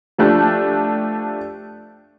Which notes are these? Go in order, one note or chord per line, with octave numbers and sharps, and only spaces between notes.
F3 A3 D4 G4